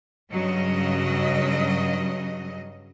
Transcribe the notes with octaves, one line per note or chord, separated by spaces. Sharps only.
G2 C#3 F#3 D#5